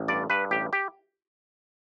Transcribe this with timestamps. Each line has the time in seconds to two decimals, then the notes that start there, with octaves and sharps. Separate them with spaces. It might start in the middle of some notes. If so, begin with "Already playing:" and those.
Already playing: A1
0.08 G2 D5
0.30 G2 B4
0.51 A1 G4
0.73 G4